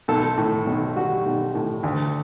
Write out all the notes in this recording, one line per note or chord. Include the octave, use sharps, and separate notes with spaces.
B1 A4
A2
B1
G3 F#4
B1
A2
D2